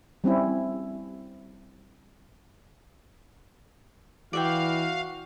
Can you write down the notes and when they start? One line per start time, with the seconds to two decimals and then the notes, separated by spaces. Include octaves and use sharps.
0.24 G3 C4 C#4 E4
4.33 E3 F#4 D5 E5 F5 G5